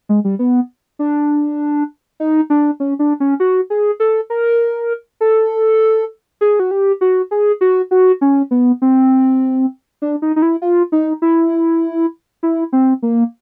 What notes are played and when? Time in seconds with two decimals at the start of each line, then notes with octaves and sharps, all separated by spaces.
0.09 G#3
0.24 G3
0.39 B3
0.99 D4
2.20 D#4
2.50 D4
2.80 C#4
2.99 D4
3.20 C#4
3.40 F#4
3.70 G#4
4.00 A4
4.30 A#4
5.21 A4
6.41 G#4
6.60 F#4
6.71 G4
7.01 F#4
7.31 G#4
7.61 F#4
7.91 F#4
8.21 C#4
8.51 B3
8.82 C4
10.02 D4
10.22 D#4
10.36 D#4
10.42 E4
10.62 F4
10.92 D#4
11.22 E4
12.43 E4
12.73 C4
13.03 A#3